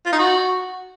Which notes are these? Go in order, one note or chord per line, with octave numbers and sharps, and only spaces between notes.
F4
D#4
F#4